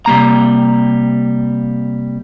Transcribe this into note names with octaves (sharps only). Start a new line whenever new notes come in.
C3 G3 A#3 A#5